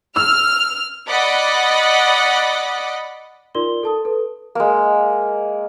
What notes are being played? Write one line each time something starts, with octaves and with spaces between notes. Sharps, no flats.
E6 F6
D5 D#5 F#5 B5
D#4 F4 A#4 D5 C6 G7
A4 A5 D#6
A4 B4
G#3 A#3